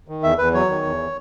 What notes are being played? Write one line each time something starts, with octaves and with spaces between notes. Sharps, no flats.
D#3
E2 E5
E2 B4
F#3 C#5
D#3
E2